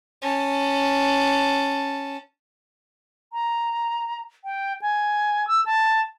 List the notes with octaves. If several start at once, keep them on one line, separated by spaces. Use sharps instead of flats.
C#4 A5
A#5
G5
G#5
E6
A5